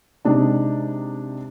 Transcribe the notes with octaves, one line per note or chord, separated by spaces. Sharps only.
C3 G#3 D4 D#4